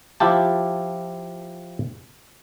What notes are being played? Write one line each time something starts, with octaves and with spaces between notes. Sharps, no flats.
F3 E4 F4 G4 A5